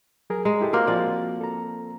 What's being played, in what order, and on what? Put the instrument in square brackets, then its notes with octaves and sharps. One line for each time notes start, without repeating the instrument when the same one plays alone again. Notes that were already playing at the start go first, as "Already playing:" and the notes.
[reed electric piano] F#3 G#4 A#4
[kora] G#3 [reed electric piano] A#5
[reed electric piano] E4 G4 A4
[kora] A#3 C4 A#4 [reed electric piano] F4 F#4 D6
[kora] F3 D5
[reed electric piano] A4 A#5